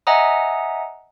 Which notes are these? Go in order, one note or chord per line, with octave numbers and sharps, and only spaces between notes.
D#5 E5 F#5 G#5 A#5 D#6